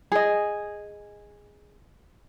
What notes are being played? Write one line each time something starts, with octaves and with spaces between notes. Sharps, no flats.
G#4 D#5